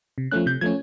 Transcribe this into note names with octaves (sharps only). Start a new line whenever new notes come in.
C3
F3 A3 C#4 F#6
C3 G6
F3 A3 C#4 G#6